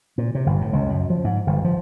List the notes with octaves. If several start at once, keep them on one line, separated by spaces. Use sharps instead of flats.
A#2
C3
G1
A2
C#2
F#2
F3
G#2
G1
F3